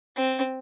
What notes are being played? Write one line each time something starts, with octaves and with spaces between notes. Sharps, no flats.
C4